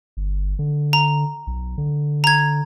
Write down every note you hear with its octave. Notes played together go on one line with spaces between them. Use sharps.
G1
D3
A#5
B1
D3
A#5 G#6